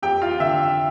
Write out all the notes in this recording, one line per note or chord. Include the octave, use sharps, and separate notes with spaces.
F2 G4 G5
F4 F5
D3 E5